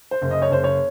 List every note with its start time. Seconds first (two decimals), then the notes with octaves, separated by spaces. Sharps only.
0.11 C5
0.22 F#1
0.31 D#5
0.42 C#5
0.51 F#1 C5
0.64 C#5